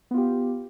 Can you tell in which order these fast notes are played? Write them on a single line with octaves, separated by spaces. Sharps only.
B3 F4 G4